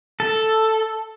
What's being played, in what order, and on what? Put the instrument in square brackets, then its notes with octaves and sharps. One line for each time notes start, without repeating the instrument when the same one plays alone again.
[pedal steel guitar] A4